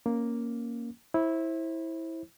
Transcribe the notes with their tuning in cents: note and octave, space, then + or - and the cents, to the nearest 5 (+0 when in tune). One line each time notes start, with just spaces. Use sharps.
A#3 +0 C#4 +0
E4 -10 C5 +30